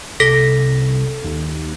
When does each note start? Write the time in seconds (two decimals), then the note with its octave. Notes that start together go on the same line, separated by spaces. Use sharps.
0.20 C2 A4 A#6 B6
1.24 D#2